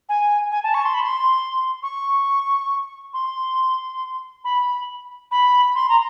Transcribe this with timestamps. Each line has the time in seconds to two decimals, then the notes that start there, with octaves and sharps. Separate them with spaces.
0.09 G#5
0.52 G#5
0.63 A5
0.74 C#6
0.85 C6
0.94 B5
1.03 C6
1.83 C#6
3.14 C6
4.44 B5
5.31 B5
5.75 C6
5.89 A#5